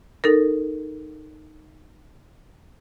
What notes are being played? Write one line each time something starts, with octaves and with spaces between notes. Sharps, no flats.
D#4 A4 A#4